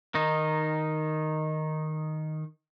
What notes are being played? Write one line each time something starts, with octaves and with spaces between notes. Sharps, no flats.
D#3 D#4